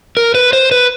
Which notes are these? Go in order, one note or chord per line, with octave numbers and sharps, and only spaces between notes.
A#4
B4
C5
B4